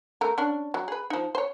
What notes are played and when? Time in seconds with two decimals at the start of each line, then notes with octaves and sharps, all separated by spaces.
0.21 A3 A#4
0.38 C#4 D4
0.74 F#3
0.88 G#4 B4
1.10 F3 D#4
1.35 C5 C#5